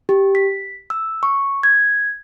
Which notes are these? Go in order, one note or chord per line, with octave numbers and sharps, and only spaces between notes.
G4
B6
E6
C#6
G#6